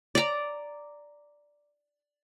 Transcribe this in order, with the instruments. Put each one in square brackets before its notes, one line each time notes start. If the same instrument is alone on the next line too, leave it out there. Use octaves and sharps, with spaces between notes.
[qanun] D5 A#5